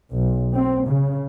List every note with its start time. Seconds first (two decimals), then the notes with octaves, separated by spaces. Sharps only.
0.11 B1
0.53 C4
0.85 C#3